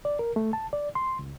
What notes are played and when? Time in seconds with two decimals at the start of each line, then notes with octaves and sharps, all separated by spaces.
0.05 D5
0.19 A#4
0.36 A3
0.53 A5
0.73 D5
0.95 C6
1.19 C#2